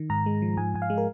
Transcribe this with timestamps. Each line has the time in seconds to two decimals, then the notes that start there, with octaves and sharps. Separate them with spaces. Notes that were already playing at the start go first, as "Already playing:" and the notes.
Already playing: D#3
0.10 G#2 A#5
0.26 G#3
0.42 F3
0.57 G#2 G#5
0.74 G#2 G#5
0.82 F5
0.90 G#3
0.98 A#4